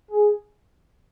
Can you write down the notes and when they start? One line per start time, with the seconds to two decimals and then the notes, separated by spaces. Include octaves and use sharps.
0.11 G#4